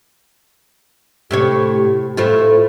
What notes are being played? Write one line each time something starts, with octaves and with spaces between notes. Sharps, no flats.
A2 C3 G4 C#5
A2 A3 F4 C5